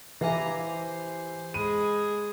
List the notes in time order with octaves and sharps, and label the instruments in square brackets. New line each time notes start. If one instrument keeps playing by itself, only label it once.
[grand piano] E3 E4 [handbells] G4 F5 G#5 [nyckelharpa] A#5
[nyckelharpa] C5
[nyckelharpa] G#3 G#4 [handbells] B5 [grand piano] D#7